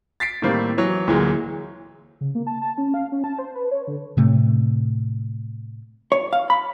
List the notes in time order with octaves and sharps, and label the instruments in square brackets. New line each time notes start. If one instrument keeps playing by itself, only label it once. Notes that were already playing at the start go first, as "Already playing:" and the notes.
[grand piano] A6 B6 C7 D7
A2 D#3 G3 A#3 C4
E3 F#3
D2 A#2 E3 F#3 G#3
[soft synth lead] C#3
A#3
A5
A5
C#4
F5
C#4
A5
C5
B4
C#5
D3
[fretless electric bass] A2 C3 A3
[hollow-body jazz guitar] C#5
F5
B5